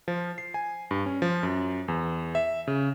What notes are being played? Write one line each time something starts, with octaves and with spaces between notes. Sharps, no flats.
F3
C7
G#5
G2
C#4
F3
F#2
E2
E5
C#3